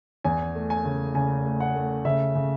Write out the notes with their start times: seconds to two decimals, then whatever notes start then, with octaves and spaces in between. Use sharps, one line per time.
0.24 E2 G#5
0.55 A3
0.70 G#5
0.85 C#3
1.15 C#3 G#5
1.45 A3
1.60 F#5
1.75 A3
2.05 C#3 E5
2.35 C#3